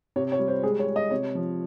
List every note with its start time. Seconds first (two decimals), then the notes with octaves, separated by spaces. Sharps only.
0.16 C3 C#5
0.32 C#5
0.39 G3
0.48 C5
0.63 G#3 G#4
0.79 C#5
0.87 G#3
0.96 D#5
1.11 C3 C#5
1.35 F3